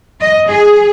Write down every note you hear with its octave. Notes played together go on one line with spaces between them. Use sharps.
D#5
G#4